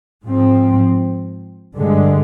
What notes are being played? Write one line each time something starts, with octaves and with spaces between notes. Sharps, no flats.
G#2 F3 C4
G2 D3 G#3